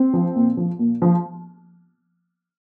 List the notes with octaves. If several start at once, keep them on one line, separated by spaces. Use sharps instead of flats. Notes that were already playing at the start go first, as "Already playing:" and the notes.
Already playing: C4
F3
A#2
F3
A#2
F3